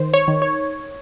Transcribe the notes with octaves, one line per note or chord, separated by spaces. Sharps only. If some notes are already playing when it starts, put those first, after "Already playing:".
Already playing: D#3 C5
C#5
D#3
C#5